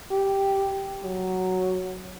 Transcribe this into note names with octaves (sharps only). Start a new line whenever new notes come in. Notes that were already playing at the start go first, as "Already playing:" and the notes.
G4
F#3